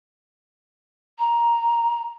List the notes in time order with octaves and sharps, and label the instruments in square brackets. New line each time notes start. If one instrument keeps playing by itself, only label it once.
[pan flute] A#5